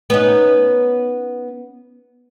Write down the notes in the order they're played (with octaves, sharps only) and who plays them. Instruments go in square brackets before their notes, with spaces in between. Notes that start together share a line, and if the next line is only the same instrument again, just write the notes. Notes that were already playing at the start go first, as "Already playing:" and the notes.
[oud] B3 C#4 D#4